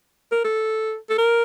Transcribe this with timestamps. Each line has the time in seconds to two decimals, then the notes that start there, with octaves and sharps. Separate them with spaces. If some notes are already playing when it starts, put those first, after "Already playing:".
0.32 A#4
0.44 A4
1.09 A4
1.18 A#4